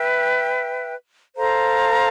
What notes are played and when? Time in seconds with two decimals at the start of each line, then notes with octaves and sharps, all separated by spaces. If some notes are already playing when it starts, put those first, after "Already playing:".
Already playing: B4 E5 G5
1.35 A4 C5 F5 A#5